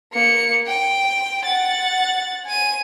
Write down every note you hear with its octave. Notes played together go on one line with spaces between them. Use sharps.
A#3 C#7
G5
F#5 A6
G#5 D#7